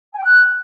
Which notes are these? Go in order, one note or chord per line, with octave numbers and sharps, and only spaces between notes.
G#5
G5
F#6